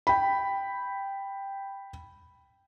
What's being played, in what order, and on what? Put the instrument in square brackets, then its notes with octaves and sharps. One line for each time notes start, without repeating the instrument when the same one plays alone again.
[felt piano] G5 B5